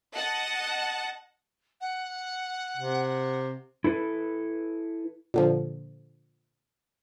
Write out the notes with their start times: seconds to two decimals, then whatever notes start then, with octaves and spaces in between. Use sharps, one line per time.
0.15 D#5 F#5 A5
1.81 F#5
2.77 C3
3.84 E4 A4 B4
5.34 A#2 D3 F3